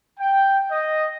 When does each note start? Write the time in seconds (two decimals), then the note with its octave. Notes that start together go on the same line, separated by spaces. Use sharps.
0.19 G5
0.70 D#5